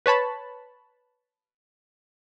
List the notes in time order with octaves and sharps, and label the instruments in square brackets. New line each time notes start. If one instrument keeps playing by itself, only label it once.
[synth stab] B4 C#5 A5 B5